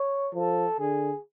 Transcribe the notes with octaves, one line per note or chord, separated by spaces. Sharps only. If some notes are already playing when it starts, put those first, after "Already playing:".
Already playing: C#5
F3 A4
D3 G#4